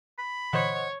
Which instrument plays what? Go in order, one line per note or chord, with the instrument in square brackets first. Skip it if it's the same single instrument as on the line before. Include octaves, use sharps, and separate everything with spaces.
[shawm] B5
[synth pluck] A#2 D3 E3 [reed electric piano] C5 D#5 F#5 [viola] C#5